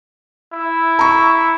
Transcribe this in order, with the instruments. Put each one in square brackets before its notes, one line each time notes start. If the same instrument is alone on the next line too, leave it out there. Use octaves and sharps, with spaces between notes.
[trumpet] E4
[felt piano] A#5 C#6